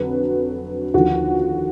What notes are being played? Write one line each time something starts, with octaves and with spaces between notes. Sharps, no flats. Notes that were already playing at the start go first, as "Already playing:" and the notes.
Already playing: F2 D3 F#3 B4
D#2 D3 F3 F#4